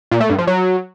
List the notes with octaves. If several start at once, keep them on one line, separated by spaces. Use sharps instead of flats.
A#2
A3
G2
F3
F#3